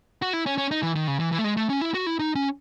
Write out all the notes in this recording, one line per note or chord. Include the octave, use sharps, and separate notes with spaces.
F#4
E4
C#4
C#4
D#4
E3
D#3
C#3
E3
E3
A3
G#3
A3
C#4
E4
F#4
E4
D#4
C#4